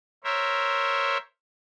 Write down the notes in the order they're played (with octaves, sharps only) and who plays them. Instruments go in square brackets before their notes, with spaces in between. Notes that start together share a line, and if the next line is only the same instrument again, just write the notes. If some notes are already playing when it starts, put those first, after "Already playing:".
[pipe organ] A#4 C5 C#5 E5